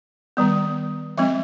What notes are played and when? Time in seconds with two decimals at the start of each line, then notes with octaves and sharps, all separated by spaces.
0.37 D#3 G3 B3
1.17 F3 G#3 C4 E5